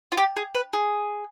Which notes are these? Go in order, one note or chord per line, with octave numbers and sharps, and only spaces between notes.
F4
G4
G#4
B4
G#4